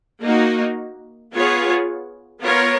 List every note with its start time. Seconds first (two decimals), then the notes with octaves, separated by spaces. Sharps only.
0.22 A#3 D#4 F#4
1.33 B3 F4 G#4 C#5
2.42 B3 F4 A#4 C#5